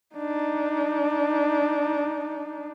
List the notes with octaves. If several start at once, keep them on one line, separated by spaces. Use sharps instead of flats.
D4 D#4